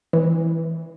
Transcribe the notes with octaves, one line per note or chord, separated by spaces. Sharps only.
E3